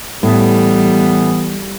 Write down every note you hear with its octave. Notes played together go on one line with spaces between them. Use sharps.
A2 E3 G3 B3